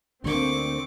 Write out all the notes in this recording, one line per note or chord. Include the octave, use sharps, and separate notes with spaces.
D2 D3 A#3 C4 C#6 D6